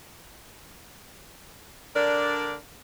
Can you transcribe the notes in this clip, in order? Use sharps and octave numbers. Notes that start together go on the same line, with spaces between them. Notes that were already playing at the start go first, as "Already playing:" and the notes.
D3 D4 A#4 D5